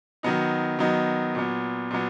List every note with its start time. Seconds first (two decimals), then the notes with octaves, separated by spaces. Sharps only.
0.23 D#3 F#3 B3 D#4
0.79 D#3 F#3 B3 D#4
1.35 A#2 F#3 B3
1.91 A#2 F#3 B3